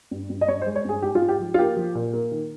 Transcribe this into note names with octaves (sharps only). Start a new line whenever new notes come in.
G2
G2
D#5
G2 C#5
C5
G#3
C#5
G2 G#4
G#2 G4
F4
G#2
G4
F3
F4
A#3 G4
F3
A#2
A#3
D#3